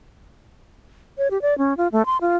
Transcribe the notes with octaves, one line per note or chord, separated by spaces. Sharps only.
C#5
G4
D5
C#4
F4
A3
C6
F4